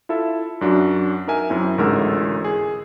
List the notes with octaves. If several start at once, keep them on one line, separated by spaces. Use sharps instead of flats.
E4 F4 A4 E5
F#2 D4 F#4
D#4 A#4 E5 G#5
F#2 C4 E4
A1 D2 G#2 A3 A#4 E6
G#4